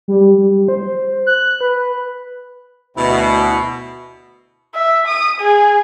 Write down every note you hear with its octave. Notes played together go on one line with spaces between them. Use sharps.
G3
G3
C5
F#6
B4
D2 B2 E4
E5
D#6
G#4